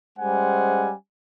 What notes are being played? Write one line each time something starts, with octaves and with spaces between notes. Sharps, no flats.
G3 G#3 C#4 C5 F#5 G#5